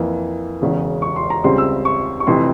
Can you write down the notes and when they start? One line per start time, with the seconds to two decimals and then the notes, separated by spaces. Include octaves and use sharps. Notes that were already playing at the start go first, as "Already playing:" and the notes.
Already playing: F2 E3 A#3
0.61 E1 E2 C#3
1.02 C#6
1.16 C6
1.30 A#5
1.44 C#2 C#3 G3 C4 C6
1.58 E6
1.85 C#6
2.20 C#6
2.27 F1 F2 C3 E3 C6